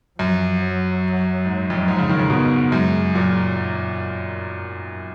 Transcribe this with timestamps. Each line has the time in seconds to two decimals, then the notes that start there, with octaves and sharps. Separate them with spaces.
0.19 F#2 F3
0.61 F#3
1.45 G#2
1.70 F2
1.79 F#2
1.87 G#2 F3
1.98 C#3
2.09 D#3
2.19 C#3
2.30 B2 B3
2.72 F#2 G#3
3.14 A#2 F#3